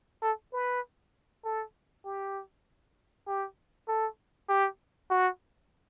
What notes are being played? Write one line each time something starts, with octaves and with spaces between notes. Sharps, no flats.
A4
B4
A4
G4
G4
A4
G4
F#4